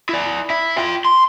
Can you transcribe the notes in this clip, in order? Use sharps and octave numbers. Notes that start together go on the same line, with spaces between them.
E4 D5
E4
F4 G5
C6